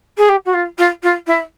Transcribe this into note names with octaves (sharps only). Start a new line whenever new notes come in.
G#4
G4
F#4
F4
F4
F4
E4